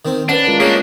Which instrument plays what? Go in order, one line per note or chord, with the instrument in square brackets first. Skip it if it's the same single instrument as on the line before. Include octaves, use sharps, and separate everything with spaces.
[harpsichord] D#3 C4
[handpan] C#4 B4 [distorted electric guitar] D4 [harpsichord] F#5
[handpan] G#3 F4 A#4
[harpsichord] A3 G#4 C#5 [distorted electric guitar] A#3 D4